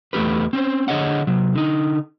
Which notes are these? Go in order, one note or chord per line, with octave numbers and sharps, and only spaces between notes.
E2 A3 E4 G4 B4
C4 C#4 C5
D3 G#4 C#5 D#5 F#5
C3 F#3
D3 D#4